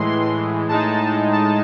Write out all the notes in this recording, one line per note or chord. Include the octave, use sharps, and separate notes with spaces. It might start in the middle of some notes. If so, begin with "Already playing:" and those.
Already playing: A2 E3 G#3 C6
A2 G#3 D#4 A5
A5